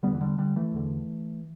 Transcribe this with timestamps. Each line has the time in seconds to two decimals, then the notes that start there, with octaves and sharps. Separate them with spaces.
0.03 E2 D3 G3 B3
0.14 E3
0.21 D3 G3
0.38 D3 G3
0.56 E3 A3
0.74 E2 D3